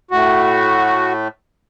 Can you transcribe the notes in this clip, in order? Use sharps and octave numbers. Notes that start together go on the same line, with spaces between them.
A2 A3 F#4